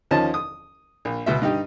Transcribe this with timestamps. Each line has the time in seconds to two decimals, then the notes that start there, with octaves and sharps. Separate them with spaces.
0.11 D#2 F3 C#4 D#5 A5
0.34 D#6
1.05 A#1
1.26 C#2 B2 E5
1.42 G2 D#4 G4